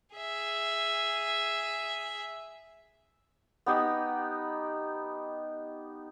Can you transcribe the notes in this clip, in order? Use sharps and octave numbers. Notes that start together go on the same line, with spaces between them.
G#4 E5
B3 D#4 G4